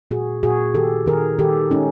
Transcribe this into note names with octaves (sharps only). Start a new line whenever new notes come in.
A#2 F#4 G#4
A#2 F#4 G#4
D#3 G4 A4
D#3 G#4 A#4
D#3 G4 A4
G#3 C#4 D#4